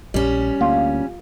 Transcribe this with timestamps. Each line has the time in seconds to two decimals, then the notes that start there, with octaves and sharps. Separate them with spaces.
0.14 A#1 G3 C#4
0.61 D2 A#3 F4